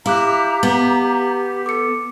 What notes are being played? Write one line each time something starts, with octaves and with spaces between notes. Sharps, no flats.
E4 G4 F5 A#5 D6 F#6
B3
A4 D6 C#7